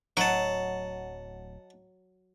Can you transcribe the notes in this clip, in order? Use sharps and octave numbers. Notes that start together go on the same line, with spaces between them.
D1 F#3 D#5 F#5 A5